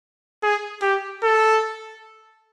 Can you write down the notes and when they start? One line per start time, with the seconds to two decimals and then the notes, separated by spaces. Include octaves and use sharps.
0.43 G#4
0.82 G4
1.23 A4